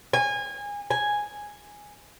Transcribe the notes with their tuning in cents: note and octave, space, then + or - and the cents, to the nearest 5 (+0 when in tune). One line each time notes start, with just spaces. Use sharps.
G#5 -25
G#5 -5